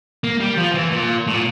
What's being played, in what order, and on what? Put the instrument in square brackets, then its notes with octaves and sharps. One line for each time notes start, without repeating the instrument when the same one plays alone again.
[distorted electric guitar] A#3
G3
F3
E3
A#2
A2
A#2